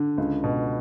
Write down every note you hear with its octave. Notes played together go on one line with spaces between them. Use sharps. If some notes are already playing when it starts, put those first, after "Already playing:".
Already playing: D3
C#2
B2